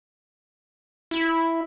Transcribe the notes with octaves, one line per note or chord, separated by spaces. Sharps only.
E4